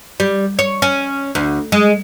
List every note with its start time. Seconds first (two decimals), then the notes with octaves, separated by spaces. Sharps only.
0.20 G3
0.59 C#5
0.82 C#4
1.35 D2
1.72 G#3